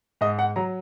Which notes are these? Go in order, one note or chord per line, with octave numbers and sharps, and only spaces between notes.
G#2 D#5
F#5
F#3 A#5